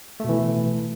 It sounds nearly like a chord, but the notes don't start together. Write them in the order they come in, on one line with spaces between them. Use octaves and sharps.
A3 B2 E3